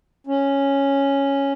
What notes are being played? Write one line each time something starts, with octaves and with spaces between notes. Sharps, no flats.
C#4